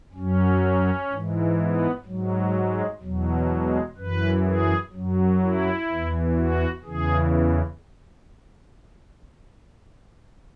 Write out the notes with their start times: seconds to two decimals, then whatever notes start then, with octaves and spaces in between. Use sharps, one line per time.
0.14 F#2 F#3 C#4
1.09 G#2 E3
1.57 B3
2.05 G#2 F#3
2.53 G#3
3.01 E2 B2 F#3
3.49 G#3
3.96 F#2 E3 B4
4.44 G#4
4.92 F#2 F#3
5.40 E4
5.88 E2 E3
6.36 F#4
6.83 E2 C#3 E3 G#4